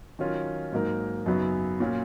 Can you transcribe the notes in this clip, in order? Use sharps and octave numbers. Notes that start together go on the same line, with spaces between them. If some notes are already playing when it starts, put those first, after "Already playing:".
D#3 F#3 C#4 F4
G#2 F#3 A#3 D#4 A#4
F#2 C#3 F#3 B3 D#4
A#2 F#3 C#4 F4